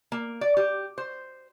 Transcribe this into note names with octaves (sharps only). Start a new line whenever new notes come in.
A#3
D5
G4
C5